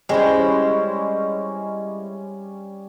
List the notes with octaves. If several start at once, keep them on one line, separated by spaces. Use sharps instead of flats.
G3 G#3 C#4 E4 C5